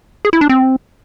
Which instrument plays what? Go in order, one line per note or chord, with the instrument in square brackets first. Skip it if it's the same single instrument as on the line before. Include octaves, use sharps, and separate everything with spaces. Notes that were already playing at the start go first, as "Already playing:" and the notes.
[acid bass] G#4
E4
D4
C4